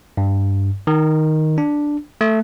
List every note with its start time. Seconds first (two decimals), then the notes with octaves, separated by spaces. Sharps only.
0.17 G2
0.87 D#3
1.58 D4
2.21 A3